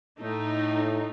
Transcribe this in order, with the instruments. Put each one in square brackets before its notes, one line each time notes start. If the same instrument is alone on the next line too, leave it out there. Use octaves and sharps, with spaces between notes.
[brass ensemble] A2 [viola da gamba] A3 [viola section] D#4